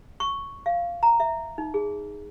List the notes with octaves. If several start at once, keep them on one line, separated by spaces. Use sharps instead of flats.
C#6
F5
A#5
E5
D#4
G#4